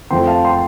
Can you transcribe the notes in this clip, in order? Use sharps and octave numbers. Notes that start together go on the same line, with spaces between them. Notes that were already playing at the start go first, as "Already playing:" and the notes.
F2 F3 A3 G5 C6
F5 A5
G5 C6